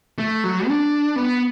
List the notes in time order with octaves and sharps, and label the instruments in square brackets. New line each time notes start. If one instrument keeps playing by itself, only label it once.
[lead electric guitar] A3
F#3
D4
B3